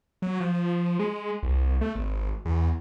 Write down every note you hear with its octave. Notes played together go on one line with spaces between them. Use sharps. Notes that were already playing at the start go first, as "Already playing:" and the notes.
F#3
F3
G#3
C2
A3
G#1
E2